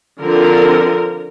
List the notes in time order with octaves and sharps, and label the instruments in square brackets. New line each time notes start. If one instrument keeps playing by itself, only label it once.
[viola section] D3 F3 C4 A#4